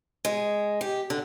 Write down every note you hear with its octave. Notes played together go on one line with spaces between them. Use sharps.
G#3
G4
D3